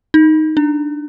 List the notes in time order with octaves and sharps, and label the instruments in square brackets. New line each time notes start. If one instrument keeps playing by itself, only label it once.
[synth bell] D#4
D4